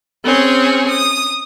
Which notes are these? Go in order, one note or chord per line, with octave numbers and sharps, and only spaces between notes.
C4 C#4 G#4
D#6